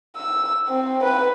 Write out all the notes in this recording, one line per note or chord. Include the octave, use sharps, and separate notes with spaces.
E6
C4
B4